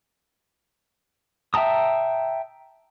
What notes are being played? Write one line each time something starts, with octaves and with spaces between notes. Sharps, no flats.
E5 G5 A5 A#5 D#6